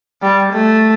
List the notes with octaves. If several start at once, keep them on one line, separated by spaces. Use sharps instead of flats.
G3
A3